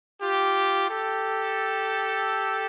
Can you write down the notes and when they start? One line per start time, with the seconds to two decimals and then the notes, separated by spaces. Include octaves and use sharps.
0.20 F4 G4
0.89 G4 A4